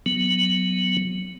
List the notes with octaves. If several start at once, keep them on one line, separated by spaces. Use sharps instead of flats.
F#3 B3